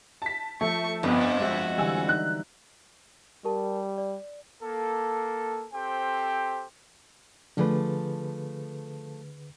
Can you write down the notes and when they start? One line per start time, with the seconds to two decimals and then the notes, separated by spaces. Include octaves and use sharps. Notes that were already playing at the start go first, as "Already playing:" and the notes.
0.22 A5 B6
0.61 F3 A3 E5 C#6
1.03 G1 F2 B3
1.40 G#3 F#4 E5
1.78 D3 E3 G3 G#5 E6
2.09 D#4 F#6
3.45 G3 G4 A#4 A5
3.98 D5
4.63 A#3 A4
5.74 C4 G4 A4 C5 G5
7.57 D3 F3 A3 G#4 B4 D5